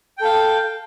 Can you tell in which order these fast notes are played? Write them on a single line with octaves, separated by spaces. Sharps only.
G5 A4 F5